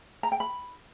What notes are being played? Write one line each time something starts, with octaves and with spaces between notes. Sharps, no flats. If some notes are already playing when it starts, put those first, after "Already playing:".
A#5
G5
B5